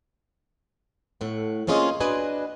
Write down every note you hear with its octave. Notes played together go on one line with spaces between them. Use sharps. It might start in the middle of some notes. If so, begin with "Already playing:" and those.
A2 A3 F#5
A#3 C4 C#4 F4 G#4 D#5
D4 F#4 B4 D#5 G#5